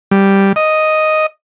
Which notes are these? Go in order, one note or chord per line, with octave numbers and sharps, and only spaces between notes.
G3
D#5